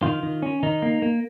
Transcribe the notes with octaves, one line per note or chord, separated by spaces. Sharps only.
D#3 F4
D#3
C#4
D#3 D#4
A#3
A#3